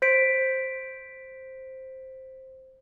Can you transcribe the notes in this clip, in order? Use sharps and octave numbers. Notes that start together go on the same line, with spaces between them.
C5 B6 D7